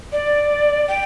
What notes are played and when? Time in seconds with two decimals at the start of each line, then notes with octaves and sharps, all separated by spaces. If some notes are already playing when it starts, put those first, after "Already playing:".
0.12 D5
0.88 G5